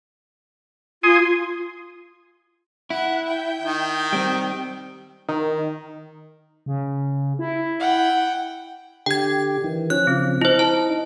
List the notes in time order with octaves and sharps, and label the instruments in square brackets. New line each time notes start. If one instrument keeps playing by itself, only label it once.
[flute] F4 [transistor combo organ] G#5 C6 D#6
[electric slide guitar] E4 [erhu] F#5
[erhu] G5
[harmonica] D#3
[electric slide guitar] G3 C4
[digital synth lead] D#3
[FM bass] C#3
E4
[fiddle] F#5 G5
[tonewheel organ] D3 G4 [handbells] G5 G#6
[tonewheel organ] D#3 E3
[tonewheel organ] F3 C#4 [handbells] F#6
[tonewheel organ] C#3 F3 [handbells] C4
[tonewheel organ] D#4 [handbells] E4 C5
[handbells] A5